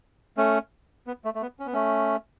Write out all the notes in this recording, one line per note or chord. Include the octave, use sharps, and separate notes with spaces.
A3 C#4
B3
A3
A3
B3
C#4
B3
A3 C#4